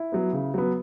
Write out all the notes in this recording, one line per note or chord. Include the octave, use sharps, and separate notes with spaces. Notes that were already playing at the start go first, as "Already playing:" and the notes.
Already playing: E4
F#3 B3
C#3
F#3 B3